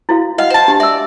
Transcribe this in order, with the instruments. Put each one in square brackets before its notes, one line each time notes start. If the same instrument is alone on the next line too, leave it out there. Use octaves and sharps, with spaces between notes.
[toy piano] E4 F#4 F5
[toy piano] D#5 F#5 [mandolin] F5
[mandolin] C5 A5
[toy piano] D4 G4
[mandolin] D5 [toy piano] E5 E6